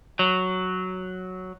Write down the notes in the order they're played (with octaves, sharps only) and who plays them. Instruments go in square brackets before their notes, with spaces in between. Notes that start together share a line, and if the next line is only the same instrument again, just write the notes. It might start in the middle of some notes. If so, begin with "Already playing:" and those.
[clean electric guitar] F#3